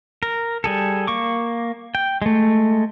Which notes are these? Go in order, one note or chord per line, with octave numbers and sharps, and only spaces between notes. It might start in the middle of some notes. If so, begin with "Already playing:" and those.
A#4
G3 G#4 A4
A#3 C#6 D6
G5
G#3 A3